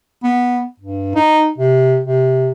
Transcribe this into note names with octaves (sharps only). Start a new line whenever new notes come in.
B3
G2
D#4
C3
C3